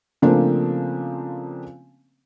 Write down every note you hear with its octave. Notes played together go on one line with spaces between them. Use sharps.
C#3 F3 A3 A#3 C4 D4